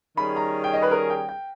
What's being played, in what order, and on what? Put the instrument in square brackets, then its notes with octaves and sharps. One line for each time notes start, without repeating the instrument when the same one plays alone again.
[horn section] D#3 G3 C#4 G#4 [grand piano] B5
[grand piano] A#5
G5
D#5
B4
A#4
G5
G5